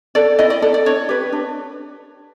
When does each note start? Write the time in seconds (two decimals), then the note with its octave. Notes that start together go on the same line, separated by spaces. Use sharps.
0.15 A4 D5
0.39 E4 D#5
0.50 D5
0.62 A4 D5
0.74 D5
0.86 D4 C#5
1.09 G4 B4
1.32 D4